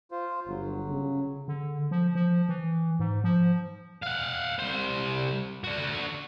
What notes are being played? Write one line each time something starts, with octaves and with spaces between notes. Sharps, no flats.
F4 C5
G1 F#3
C#3
D3
F3
F3
E3
G#2
F3
F5 F#5
C2 C5
D4 F#4